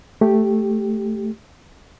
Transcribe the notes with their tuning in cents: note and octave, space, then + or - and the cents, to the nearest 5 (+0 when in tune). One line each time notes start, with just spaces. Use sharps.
A3 +0 G4 +0